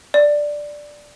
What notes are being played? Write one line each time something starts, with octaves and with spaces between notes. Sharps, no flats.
D5